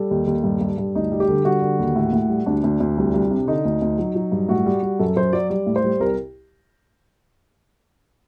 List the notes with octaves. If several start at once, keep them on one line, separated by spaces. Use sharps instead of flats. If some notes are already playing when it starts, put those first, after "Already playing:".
Already playing: G3 A4
D#2
D#2
G2
G2
G2
D2 D#4
G3
G4
D3
G3 F#4
D3
D#2
A2
A2
G3
D2 D4
D2
D2
C2
C2
C3
D3 D#4
D2
D2
F#3
F#3
G2
A2 F#4
G3
G3
F#2 A4
F#2 C5
F#3 D5
G3 D5
A2
C5
G3
C2 A#4